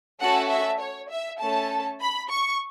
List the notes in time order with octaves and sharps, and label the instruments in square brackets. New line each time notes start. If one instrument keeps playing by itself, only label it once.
[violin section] A3 C#4 F#4 A4 F#5
E5
C#5
E5
A3 C#4 A4 A5
B5
C#6